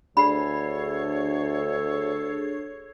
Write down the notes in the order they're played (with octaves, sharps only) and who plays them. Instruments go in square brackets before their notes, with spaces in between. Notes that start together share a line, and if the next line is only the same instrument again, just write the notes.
[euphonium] D2 [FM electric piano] D4 G#4 C7 [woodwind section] A4 C#5 [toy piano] B5